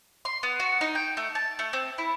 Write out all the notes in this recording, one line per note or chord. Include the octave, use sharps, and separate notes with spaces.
C6
B3
F#4
D#4
G5
A3
A5
A3
C4
E4